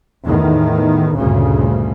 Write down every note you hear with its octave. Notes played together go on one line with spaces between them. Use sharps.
E2 A2 D#3
G1 D2 A#2 C#3